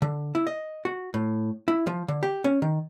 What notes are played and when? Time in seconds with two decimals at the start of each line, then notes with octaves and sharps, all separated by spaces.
0.02 D3
0.35 E4
0.47 D#5
0.85 F#4
1.14 A2
1.68 E4
1.87 F3
2.08 D3
2.23 G4
2.44 C#4
2.62 D#3